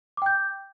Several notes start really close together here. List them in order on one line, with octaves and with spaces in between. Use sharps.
D6 G5 G6